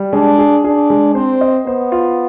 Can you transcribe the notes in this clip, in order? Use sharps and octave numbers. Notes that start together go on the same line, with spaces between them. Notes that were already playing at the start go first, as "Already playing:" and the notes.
Already playing: G3
G#3 D4
G#4
D4 G#4
G#3
C4 C5
D#5
B3 C5
F4